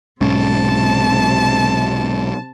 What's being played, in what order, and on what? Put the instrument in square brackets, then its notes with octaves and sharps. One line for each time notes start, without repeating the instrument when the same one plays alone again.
[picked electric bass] B1 G#2 C#4 [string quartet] C3 A5